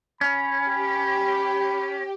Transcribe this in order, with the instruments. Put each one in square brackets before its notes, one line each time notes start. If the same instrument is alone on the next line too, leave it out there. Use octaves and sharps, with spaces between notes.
[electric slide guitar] C#4 [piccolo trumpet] B5
[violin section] G4